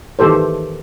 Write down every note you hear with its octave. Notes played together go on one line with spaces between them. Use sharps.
D#3 E3 G4 A4 C5